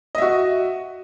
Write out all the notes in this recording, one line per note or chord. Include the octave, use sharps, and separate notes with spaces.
F#4 D#5 E5